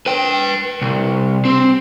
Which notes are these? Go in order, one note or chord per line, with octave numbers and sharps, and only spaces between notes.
B4 G5
C2
C4